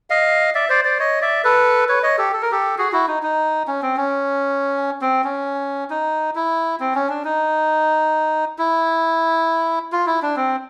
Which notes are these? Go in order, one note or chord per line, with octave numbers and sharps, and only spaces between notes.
D#5 F5
D5 E5
C5 D5
C5 D5
C#5 D#5
D5 E5
A4 B4
B4 C#5
C#5 D#5
G4 A4
A4
A#4
G4 A4
F#4 G#4
E4 F#4
D#4
D#4
C#4
C4
C#4
C4
C#4
D#4
E4
C4
C#4
D4
D#4
E4
F4
E4
D4
C4